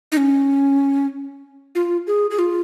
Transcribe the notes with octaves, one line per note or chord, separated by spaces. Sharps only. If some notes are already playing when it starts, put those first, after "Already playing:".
D#4
C#4
F4
G#4
G#4
F4